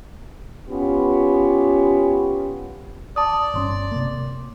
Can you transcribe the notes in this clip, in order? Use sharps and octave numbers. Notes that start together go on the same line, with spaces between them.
B3 C#4 F4 G4
D5 A5 D#6
G1 C#3 C#4 C#5 C6
C3 A#3